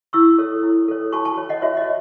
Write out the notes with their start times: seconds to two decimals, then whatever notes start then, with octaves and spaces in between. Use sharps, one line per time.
0.13 E4 C#6 E6
0.38 A4 C#5
0.63 E4
0.88 A4 C#5
1.12 F#4 A5 C#6
1.25 A5 C#6
1.38 C#5
1.49 D#5 F#5
1.62 F#4 C#5 E5
1.77 D#5